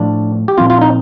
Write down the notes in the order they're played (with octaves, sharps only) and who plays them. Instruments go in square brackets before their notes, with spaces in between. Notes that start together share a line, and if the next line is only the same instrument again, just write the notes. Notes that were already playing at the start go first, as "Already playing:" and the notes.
Already playing: [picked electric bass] A2 F3 A3 [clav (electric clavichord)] D4
[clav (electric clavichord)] G4
[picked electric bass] A#2 F3 C4 [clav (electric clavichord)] F4
[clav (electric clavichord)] F4
D#4